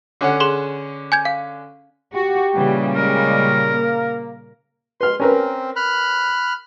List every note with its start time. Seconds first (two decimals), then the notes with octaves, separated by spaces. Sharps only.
0.21 D3 C#4 F#5
0.40 G#4 C6 G7
1.12 G#5 G6 G#6
1.25 F5
2.15 F#4 G4
2.56 A#2 C#3 E3 G3
2.95 G#3 A#4
3.73 A#3
5.01 B4 C6 F6
5.20 C4 C#4 A#4 B4
5.76 B5 F6 F#6